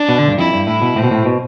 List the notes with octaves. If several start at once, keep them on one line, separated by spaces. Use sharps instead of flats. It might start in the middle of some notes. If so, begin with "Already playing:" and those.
Already playing: D4
B2
D3
G2
F2 E4
G2
A2 E4
B2
A2 C4
B2
A2
B2